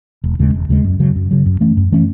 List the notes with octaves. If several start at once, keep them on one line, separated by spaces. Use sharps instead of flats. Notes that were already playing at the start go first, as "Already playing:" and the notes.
E1
D#2 C#3 G#3
E1
D#2 C#3 G#3
F#2
C#3 F#3
F#2
C#3 F#3
F#2
E3 A3 C#4
F#2
E3 A3 C#4